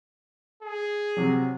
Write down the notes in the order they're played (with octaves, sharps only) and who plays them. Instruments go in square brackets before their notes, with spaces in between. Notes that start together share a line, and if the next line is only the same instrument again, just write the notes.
[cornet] G#4
[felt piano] C3 F#3